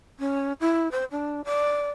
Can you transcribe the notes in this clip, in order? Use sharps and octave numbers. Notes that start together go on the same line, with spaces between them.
C#4
E4
C5
D4
D5